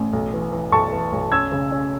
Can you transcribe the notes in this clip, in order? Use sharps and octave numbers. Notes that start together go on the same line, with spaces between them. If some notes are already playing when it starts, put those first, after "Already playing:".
Already playing: A1
B1
E3
E3
B1 A5 C#6
E3
B1
C#4 E6 G#6
C#3
C#4